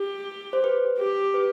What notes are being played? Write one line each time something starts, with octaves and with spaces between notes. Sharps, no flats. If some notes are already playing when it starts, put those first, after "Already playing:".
Already playing: G4
C5
B4
G4
B4